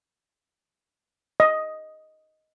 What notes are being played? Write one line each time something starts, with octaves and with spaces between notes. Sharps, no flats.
D#5